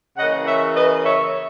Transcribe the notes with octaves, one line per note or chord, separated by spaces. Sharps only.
C#3 E3 A#3 D#5 F#5
C#5 E5
B4 D#5
C#5 E5